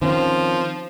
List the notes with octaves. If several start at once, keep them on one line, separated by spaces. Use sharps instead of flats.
D#3 F3 C4 C#4